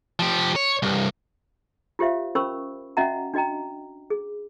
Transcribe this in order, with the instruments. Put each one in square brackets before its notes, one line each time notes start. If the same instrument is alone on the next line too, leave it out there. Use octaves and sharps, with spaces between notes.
[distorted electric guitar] F3 G4
C#5
C2 G2
[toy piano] F4 G4 C5 E5 F5
C#4 A#4 C5 B5 C#6 E6
C#4 F#4 D#5 E5 F#5 A#5
D4 F#4 D#5 G5 A#5
G#4